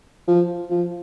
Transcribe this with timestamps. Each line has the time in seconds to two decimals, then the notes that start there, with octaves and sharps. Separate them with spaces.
0.28 F3
0.70 F3